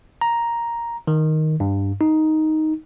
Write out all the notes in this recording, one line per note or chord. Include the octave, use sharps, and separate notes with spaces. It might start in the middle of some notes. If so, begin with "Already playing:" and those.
A#5
D#3
G2
D#4